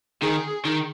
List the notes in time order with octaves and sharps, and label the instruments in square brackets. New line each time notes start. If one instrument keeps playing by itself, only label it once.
[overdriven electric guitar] D#3 [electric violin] G#4
[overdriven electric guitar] D#3